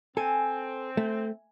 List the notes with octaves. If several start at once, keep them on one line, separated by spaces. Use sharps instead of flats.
C4 A4 G#5
A3